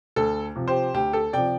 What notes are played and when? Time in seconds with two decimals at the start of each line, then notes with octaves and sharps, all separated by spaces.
0.16 D2 A4
0.56 C3 F3
0.68 G4 C5
0.94 D2 G4
1.13 A4
1.33 C3 F3 D5 G5